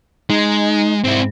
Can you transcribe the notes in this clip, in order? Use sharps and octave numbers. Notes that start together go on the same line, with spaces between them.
G#3 D#4
G#2 C4 E4